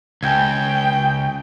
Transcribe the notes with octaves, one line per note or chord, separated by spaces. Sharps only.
C#2 G5 G#5 G6 G#6